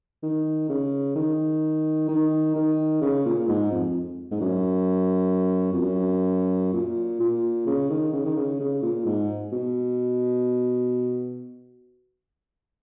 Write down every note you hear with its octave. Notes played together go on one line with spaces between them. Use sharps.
D#3
C#3
D#3
D#3
D#3
C#3
A#2
G#2
F2
G#2
F#2
F2
F#2
A#2
A#2
C#3
D#3
C#3
D#3
C#3
C#3
A#2
G#2
B2